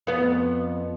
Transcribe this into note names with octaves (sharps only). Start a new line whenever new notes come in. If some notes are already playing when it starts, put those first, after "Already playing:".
F2 B3